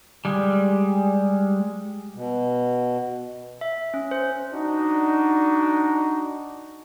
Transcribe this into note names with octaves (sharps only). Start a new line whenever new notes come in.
G3 G#3
B2
E5
C#4
C5
D4 D#4 F#4